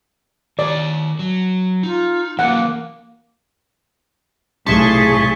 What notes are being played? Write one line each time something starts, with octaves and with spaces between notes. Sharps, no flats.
D#3 C#5 D5
F#3
D#4 F4
E3 F#3 A#3 D4 F#5
B1 A2 C3 G#4 A5 C6 C#6 B6